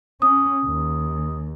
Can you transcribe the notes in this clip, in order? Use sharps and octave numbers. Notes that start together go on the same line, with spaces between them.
C#4 D#6
D#2